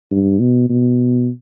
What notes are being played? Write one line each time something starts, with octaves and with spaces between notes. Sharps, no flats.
G2
B2
B2